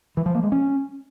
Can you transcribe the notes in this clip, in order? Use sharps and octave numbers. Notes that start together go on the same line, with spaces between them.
E3
F3
A#3
G#3
C#4